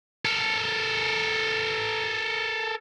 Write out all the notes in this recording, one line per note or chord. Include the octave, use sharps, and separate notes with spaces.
A4 A#4